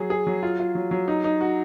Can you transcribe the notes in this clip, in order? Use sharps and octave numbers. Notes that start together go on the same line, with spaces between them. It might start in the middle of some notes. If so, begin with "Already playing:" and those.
Already playing: F#3 G#4
G#4
F#3
F4
F4
F#3
F#3
D#4
D#4
F#4